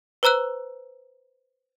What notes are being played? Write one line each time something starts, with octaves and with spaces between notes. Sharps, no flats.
B4 C5 A#5 E6 F#6